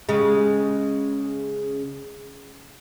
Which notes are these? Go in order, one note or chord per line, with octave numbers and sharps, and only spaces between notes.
C#3 G#3